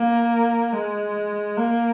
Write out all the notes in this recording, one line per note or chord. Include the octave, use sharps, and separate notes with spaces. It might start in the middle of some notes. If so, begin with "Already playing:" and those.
Already playing: A#3
G#3
A#3